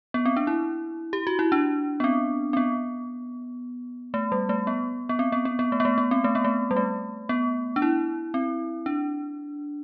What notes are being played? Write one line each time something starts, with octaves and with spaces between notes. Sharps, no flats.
B3
C4
D4
E4
G4
F#4
E4
D4
B3
C4
C4
B3
A3
G3
A3
B3
B3
C4
B3
B3
B3
A3
B3
A3
B3
C4
A3
B3
A3
G3
A3
B3
D4
E4
C4
D4